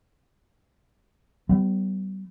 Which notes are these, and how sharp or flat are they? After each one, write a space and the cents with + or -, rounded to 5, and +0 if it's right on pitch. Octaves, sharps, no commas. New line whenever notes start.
G3 -35 B3 +20